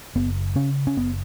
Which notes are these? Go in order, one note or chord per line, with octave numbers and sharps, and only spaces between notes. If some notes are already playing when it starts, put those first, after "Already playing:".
F#1 B3
C#3 C#4
C#4
F#1 B3